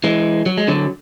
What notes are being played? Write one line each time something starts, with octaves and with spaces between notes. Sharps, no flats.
E3 G#3
F#3
G#3
D3 F#3